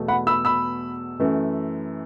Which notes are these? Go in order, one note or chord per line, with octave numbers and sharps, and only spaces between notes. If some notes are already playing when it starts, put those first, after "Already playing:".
Already playing: E2 B2 A3
F#5 B5
B5 E6
B5 E6
F#2 E3 A3